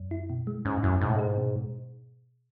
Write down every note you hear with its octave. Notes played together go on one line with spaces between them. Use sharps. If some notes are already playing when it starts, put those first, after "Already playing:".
Already playing: F#2
E4
B2
G#3
G#2 C#4
F#2 E4
G#2 B2
A2
G#2 G#4
B2